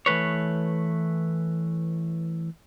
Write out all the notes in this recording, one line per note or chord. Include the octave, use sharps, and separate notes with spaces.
E3 A3 B4 C#5